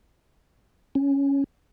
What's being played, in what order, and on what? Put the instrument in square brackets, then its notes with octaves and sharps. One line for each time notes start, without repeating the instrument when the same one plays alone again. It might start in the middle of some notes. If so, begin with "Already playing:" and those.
[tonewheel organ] C#4